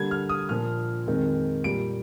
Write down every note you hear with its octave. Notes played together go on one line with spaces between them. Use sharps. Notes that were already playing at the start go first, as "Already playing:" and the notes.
Already playing: D3 G3 A#3 G#6
F6
D#6
A#2 F3 A#3 F6
F2 D#3 G#3 C4
A#2 G3 A#3 D7